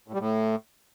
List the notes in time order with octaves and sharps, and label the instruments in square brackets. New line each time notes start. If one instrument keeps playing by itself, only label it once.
[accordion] A2
G3
A2